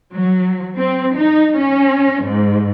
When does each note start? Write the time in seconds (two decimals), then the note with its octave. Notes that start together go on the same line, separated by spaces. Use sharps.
0.12 F#3
0.75 C4
1.14 D#4
1.57 C#4
2.23 G#2